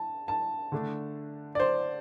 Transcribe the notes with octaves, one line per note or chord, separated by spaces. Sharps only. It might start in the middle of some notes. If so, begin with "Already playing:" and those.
Already playing: A5
A5
D3 A3 D4
D5
C5